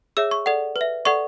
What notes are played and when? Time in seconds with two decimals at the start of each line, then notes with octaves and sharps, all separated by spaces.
0.17 G#4 C#5 E5 E6
0.31 C#6
0.46 A4 D5 F#5
0.76 B4
0.81 E5
1.05 A4 D5 F#5 C#6